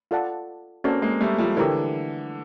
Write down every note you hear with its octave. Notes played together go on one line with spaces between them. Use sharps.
F4 A4 D5 F#5 A5
A#3 C4 C#4 F#4 A4 D5
G#3 A#3
G3 A3
F3 G3
D3 E3 G4 A#4 C#5